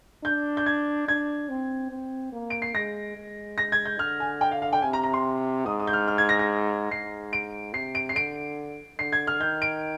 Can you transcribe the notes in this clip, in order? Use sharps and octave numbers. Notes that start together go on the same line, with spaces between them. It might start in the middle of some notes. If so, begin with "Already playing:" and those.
D4 G6
G6
G#6
D4 G#6
C4
C4
A#3
D7
C7
G#3 A#6
G#3
A#6
G#6
G6
D3 F6
G#5
G5
F5
F5
G5
C3 G#5
A#5
A#5
C6
G#2 D#6
D#6
G6
F6
F6
G#6
A#6
A#6
G#2 C7
D7
C3 C7
D7
C7
D3 D7
D3 C7
G#6
F6
D#3 G6
D7